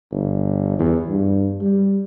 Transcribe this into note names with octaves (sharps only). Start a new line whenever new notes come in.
G1
E2
G2
G3